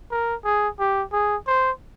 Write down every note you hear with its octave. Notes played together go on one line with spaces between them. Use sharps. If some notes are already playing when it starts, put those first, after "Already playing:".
A#4
G#4
G4
G#4
C5